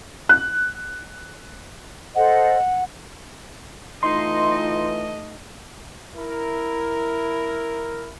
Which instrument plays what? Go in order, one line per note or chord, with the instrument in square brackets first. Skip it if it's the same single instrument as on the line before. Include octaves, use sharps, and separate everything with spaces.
[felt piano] F#6
[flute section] A4 C5 D#5 [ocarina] F#5
[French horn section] E3 F4 [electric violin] A3 D#5 [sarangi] D#4 [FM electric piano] C6
[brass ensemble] E4 A#4